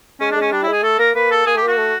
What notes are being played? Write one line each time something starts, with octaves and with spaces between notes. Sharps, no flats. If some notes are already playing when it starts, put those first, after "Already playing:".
G#3 C#4
D4
G#3
C#4
G3 D4
E4
G#3 G#4
A3 A4
A#3 A#4
A#3 B4
A4
A#3 G#4
A3 G4
A#3
F#4
A3